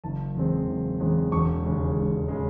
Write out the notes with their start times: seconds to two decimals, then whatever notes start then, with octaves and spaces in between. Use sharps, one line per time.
0.04 F#1 A5
0.35 E2 C#3 G#3 C4
0.68 F#1
1.00 E2 C#3 G#3 C4
1.32 E1 C#6
1.65 D#2 C#3 G#3
1.97 E1
2.28 C#3 G#3